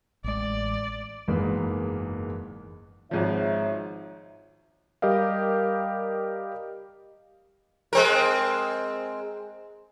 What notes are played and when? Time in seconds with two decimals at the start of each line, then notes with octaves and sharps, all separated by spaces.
0.24 A1 G#3 D5
1.28 F#1 E2 G#2 G#3 A#3 B4
3.11 G#1 G#2 F3 D#4 C#5 E5
5.02 G3 G4 A#4 D#5 F5
7.93 G#3 C4 A#4